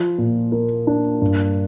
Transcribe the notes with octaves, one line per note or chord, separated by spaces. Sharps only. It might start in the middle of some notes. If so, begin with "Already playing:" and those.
Already playing: F3
A#2
A#3
D4
G2